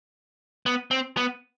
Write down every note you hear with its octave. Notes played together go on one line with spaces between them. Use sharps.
B3
C4
B3